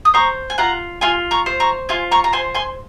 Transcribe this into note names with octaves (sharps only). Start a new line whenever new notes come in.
D#6
C5 A#5 C#6
G#5
F4 F#5 A#5
F4 G#5 C6
A#5 C#6
C5
A#5 C#6
F4 G#5 C6
A#5 C#6
A#5
C5 G#5 C6
G#5 C6